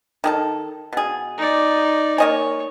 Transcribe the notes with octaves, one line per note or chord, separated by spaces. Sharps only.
D#3 G#4 A4
B2 G#4
D#4 D5
A#3 C#5 D#5 G#5